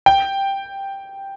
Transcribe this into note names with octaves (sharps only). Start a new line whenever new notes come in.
G5